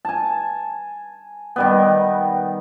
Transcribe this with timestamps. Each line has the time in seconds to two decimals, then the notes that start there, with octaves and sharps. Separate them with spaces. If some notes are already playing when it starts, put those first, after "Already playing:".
0.05 G#5 A5
1.56 D#3 G3 B3